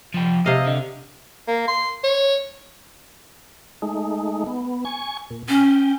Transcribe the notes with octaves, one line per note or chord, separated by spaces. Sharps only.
F3 G4
C3 D#5 F5
D3
A#3
C6
C#5
G#3 A3 D#4
B3
G#5 C#6
A#2
C#4 G5